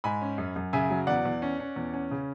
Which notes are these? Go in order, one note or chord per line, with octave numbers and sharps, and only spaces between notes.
G#2 G#5 B5
C#4
F#2
F#2
C#3 E5 G#5
F#3
E2 D5 F#5
E2
C#4
C#4
E2
C#4
C#3